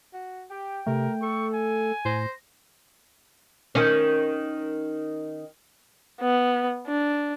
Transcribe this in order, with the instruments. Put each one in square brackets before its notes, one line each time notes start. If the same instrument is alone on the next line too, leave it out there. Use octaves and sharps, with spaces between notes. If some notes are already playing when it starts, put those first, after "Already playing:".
[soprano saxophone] F#4
[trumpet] G4 [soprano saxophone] G5
[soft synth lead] C3 [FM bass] A3 [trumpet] A#4
[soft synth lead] A4 [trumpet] C#6
[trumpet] G#5
[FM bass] A2 [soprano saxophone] C5 [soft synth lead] A#6
[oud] D#3 C#4
[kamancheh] B3
D4